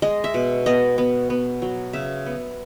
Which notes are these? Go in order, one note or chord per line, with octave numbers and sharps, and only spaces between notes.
G#3 D#5
E5
B2
B3 D#5
B3
B3
F#3
C#3 E5
B3